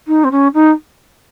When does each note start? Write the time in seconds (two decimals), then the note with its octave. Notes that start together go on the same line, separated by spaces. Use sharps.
0.07 D#4
0.24 C4
0.31 C#4
0.54 D#4